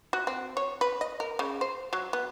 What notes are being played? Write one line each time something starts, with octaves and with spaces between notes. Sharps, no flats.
F#4
C4
C#5
B4
D#5
A#4
C#3
C5
F#3
B3